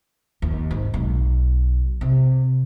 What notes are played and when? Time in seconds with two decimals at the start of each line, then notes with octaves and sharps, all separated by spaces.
0.42 D#2
0.71 G#2
0.94 B1
2.01 C3